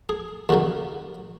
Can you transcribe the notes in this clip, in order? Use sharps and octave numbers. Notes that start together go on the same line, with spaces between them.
G#4
D#2 C#3 F#3 F#4